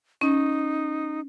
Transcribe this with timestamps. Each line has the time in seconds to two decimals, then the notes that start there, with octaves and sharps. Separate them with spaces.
0.21 C#4 D#4